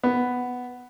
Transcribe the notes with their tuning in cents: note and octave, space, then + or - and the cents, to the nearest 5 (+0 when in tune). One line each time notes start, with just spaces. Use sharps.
B3 +5